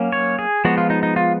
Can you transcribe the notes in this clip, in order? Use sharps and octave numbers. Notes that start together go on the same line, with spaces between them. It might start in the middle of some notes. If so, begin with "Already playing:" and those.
Already playing: F#3 A#3 C#4
C#5
G#4
F3 G#3 B3 F#4
F4
D#4
D#4
F4